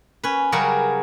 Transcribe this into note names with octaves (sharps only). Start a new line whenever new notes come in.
C#4 B4
C#3 F#3 G3 F#4 G#4 A#4